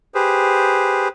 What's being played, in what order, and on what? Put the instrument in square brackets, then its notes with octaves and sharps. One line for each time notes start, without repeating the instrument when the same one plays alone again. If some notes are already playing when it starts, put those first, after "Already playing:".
[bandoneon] G4 G#4 B4 C5